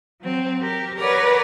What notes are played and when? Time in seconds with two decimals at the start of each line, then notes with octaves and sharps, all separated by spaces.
0.21 F#3 C4
0.61 G4 A#4
0.97 A#4 B4 C#5 D5 F#5 A#5